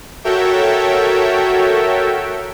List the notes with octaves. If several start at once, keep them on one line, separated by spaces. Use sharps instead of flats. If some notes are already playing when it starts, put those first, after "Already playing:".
F#4 A4 A#4 C#5 E5 G5